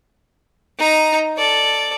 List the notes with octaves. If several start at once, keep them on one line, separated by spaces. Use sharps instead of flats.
D#4 A#5
A4 D5